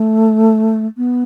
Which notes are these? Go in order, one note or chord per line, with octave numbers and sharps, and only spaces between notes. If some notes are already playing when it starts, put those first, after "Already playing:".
Already playing: A3
B3